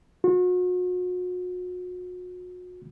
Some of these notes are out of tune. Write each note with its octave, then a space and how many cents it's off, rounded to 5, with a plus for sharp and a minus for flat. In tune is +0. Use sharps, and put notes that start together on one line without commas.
F#4 -40